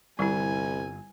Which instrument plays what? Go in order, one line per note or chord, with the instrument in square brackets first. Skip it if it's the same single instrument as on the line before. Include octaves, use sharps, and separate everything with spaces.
[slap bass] G1 [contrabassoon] C2 [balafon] G3 E4 [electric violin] G#5